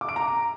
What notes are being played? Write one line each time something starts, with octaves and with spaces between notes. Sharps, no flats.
D6
D7
A#5